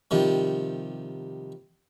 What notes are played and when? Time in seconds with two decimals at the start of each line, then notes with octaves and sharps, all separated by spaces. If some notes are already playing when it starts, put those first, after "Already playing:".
0.11 C3 D#3 F3 G3